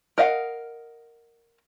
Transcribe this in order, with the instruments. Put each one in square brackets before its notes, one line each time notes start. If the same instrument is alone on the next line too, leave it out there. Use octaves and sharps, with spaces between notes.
[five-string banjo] A#4 D#5 F5 F#5